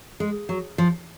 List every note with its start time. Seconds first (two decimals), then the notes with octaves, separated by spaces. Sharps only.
0.20 G#3
0.49 F#3
0.78 F3